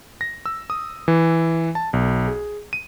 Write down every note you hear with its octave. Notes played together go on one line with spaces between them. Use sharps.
A#6
E6
D#6
E3
A5
B1
G#4
D#7